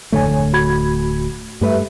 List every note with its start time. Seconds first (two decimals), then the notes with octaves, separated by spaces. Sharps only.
0.12 D1 F2 D3 A3 C#5 G#5
0.53 F#4 B5 G#6
1.61 G2 A3 G4 B4 E5